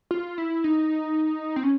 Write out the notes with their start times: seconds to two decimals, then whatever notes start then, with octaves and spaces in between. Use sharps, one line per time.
0.11 F4
0.38 E4
0.64 D#4
1.56 C4
1.63 C#4